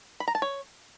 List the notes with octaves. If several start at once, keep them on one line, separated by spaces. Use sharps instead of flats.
B5
A#5
A5
C#5